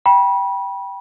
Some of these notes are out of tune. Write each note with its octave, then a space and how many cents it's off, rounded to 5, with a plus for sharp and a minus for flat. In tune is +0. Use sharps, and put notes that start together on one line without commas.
G5 +0 B5 -25